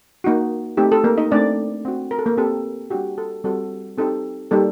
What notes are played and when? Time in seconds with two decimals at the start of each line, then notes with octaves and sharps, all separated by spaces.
0.24 A#3 D#4 F#4
0.77 A3 C4 D#4 G4
0.92 A4
1.04 A#3 A#4
1.18 D#4 D#5
1.31 A3 C4 D4 D#4 D5
1.85 C4 F#4
2.11 A#4
2.19 A4
2.26 A#3 A#4
2.37 C4 G4 A4
2.91 G3 D4 F#4 G4
3.18 A4
3.44 G3 C4 F#4 A4
3.97 C4 D#4 G4 A4
4.51 G3 A#3 D#4 G4 A4